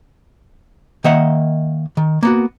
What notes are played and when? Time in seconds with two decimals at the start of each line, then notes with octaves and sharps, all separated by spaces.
1.04 D#3 A#3 D#5 E5 F#5
1.97 D#3
2.23 A#3 B3 F#4